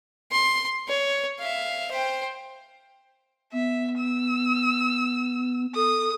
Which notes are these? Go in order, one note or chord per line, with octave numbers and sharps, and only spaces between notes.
C6
C#5
E5 F5
C5 G5
B3 E5
E6
A4 D#6